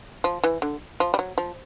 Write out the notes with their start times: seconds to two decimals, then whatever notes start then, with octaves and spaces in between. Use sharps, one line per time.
0.24 F3
0.44 E3
0.62 D3
1.00 F3
1.14 G3
1.19 F#3
1.38 F3